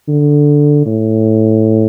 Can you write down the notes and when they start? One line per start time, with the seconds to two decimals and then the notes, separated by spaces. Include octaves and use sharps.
0.08 D3
0.86 A2